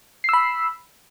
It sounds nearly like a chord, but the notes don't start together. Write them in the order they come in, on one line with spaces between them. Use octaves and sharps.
C7 E6 B5